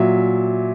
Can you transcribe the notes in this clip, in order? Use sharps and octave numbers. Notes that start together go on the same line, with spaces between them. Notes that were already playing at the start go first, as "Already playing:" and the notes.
Already playing: A#2 F#3 E5